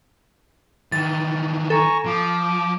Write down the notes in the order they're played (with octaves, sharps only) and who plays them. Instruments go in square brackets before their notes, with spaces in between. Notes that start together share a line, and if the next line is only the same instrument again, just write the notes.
[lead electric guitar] D#3 E3 [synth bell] A6
[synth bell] A4 [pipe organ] G#5 A#5 C#6
[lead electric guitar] F3 [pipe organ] D6